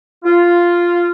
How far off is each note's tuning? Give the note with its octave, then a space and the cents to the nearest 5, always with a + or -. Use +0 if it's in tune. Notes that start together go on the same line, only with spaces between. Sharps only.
F4 -5